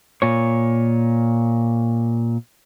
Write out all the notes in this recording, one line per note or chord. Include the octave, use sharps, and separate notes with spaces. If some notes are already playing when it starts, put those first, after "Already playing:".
A#2 C#5